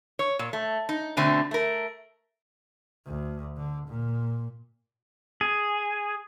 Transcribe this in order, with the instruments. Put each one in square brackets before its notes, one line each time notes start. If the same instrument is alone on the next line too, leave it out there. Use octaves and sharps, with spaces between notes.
[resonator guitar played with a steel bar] C#5
A#2
A3
D#4
B2 D3 A3 C4
A3 A#4
[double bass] D2
D3
A#2
[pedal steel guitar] G#4